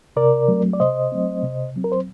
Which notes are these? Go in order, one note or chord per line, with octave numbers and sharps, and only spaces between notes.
C3 A#4 D5
F#3 A3 C4
D5
C3 C5 D#5
F#3 A3 C4
C3
F#3 C4
A#4
C5